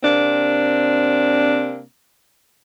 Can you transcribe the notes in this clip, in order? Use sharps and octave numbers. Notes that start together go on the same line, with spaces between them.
C3 A#3 C4 D4